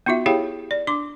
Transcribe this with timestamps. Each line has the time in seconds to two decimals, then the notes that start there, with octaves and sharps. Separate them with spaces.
0.06 B3 D#4 F4 F#4 E5
0.26 E4 G4 G#4 C#5 F5 G5
0.71 D5
0.87 D4 C6 D6